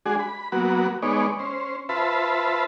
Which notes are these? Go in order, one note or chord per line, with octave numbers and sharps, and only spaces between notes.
G#3 D4 F#4 G#4
B5
F#3 A#3 B3 F#4
G#3 B3 D#4 C#5 D5
C#4 C5
F4 B4 C5 E5 A5 B5